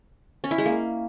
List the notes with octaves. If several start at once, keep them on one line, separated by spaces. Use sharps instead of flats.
C#4
E4
G#3
A#3